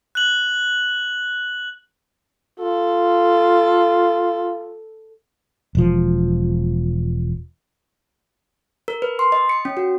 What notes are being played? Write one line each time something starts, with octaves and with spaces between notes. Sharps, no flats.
F#6 F#7
F4 A4
E1 F3
A#4
B4
C6
D#5
C#7
C#4
F#4